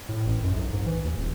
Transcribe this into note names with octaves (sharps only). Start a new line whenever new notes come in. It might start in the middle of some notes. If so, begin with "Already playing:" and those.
A2
A1
F#2
B1
G#2
E3
D#2
D#1